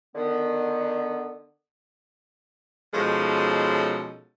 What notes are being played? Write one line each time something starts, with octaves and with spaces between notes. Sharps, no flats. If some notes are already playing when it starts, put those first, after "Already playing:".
D3 D#3 B3
B2 F3 G#3 C#4 D#4 A4